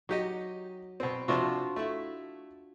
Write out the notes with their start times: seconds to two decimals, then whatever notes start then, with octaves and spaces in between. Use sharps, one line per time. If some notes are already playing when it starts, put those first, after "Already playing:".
0.09 F#3 D#4 G4 D#5
1.00 B2 C4
1.28 C3 F3 D4 F4 F#4 C5
1.76 A3 E4